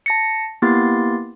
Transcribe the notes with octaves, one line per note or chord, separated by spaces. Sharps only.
A5 A#6 C#7
A#3 B3 E4 G4 C6 A6